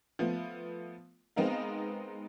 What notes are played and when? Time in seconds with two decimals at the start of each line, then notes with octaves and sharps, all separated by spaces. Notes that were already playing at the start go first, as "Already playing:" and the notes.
0.19 F3 A3 B3
1.36 G#3 B3 C4 D#4 A#4 F5